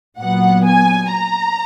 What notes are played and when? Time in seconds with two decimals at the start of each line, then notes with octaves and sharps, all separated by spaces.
0.19 A#2 F#3 B3 F#5
0.65 G#5
1.12 A#5